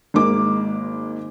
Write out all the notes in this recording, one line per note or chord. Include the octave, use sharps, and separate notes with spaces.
G#1 G#3 A#3 D6